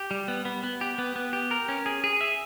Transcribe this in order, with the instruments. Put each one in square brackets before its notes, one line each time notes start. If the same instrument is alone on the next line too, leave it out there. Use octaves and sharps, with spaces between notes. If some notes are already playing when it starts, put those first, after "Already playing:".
Already playing: [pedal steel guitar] G4
G3
B3
B3
B3
G4
B3
B3
G4
A#4
C#4
G#4
G#4
E5